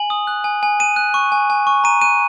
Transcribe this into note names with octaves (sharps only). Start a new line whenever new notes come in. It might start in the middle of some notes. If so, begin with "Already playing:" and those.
Already playing: G#5 F#7
D#6
F#6
G#5
G#5
G#5 D#7
F#6
C#6
G#5
G#5
C#6
A#5 D#7
F#6 D#7